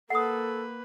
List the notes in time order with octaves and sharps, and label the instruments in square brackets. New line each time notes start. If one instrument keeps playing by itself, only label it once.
[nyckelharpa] A#3 B4 [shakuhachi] A4 [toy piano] F#5 D#6